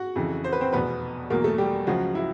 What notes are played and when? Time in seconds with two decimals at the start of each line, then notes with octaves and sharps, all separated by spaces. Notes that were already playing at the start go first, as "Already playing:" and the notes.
Already playing: F#4 F#5
0.16 F2 C#3 E3
0.44 C5
0.53 B4
0.61 C4 C5
0.73 F1 E2 B2 B3 B4
1.30 E2 B2 F#3 A#3 A#4
1.44 A3 A4
1.58 G3 G4
1.87 C#2 C#3 F3 F#3 G#3 F#4
2.15 E4